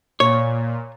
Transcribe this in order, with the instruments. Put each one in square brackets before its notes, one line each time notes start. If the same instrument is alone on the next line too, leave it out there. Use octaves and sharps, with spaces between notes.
[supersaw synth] A#2 [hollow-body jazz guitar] C#5